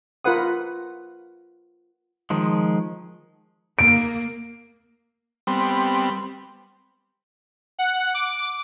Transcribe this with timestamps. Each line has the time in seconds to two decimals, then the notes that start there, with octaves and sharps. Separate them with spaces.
0.24 F4 A#4 B4 F#5 D#6
2.30 D#3 F3 G#3
3.79 A#3 D7
5.47 G3 B3 C4
7.79 F#5
8.14 D6